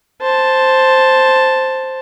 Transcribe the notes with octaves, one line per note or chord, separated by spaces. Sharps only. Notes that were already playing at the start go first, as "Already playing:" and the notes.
C5 A5